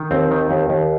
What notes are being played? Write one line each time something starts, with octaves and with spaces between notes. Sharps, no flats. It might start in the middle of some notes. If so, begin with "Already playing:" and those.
Already playing: D#3
D#2 C4
D#3
D#2
D#2